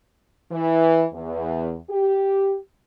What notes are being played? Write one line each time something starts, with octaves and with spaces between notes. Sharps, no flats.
E3
E2
G4